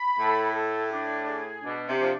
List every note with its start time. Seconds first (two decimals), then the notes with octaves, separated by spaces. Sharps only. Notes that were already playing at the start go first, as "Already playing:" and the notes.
Already playing: B5
0.19 A2 A4
0.54 A4
0.91 D4
1.27 G#4
1.62 B2 D4
1.87 C3
1.99 F3 D4